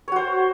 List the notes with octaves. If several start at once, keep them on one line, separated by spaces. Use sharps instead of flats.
F#4 C5 C#5